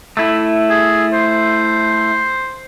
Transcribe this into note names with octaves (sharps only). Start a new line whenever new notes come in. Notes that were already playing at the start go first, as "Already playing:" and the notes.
A3 E4
G#4
C5